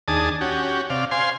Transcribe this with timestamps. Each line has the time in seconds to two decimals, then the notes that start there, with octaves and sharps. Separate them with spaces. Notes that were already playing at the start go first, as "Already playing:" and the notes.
0.08 D#2 D4 G#4 A5 D#6
0.41 C#4 F#4 G4
0.90 C3 D5 F5
1.11 C5 F5 G#5 C6